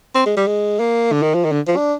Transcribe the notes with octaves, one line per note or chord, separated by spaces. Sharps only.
C4
G#3
G3
G#3
A#3
D3
D#3
F3
D#3
D3
F3
D4